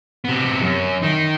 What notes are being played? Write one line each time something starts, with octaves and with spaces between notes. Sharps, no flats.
C3 B3
F#2
D#3 D#4